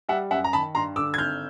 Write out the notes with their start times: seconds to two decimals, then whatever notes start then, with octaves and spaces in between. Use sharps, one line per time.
0.09 G3 E5 F#5
0.31 F#2 E5 F#5
0.44 A#5
0.53 D#3 A5 B5
0.75 G2 A#5 C6
0.96 D3 D6 E6
1.14 G#6
1.18 G#1 F6 G6